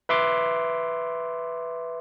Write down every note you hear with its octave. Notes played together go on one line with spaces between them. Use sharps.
B4 E5 C6 D6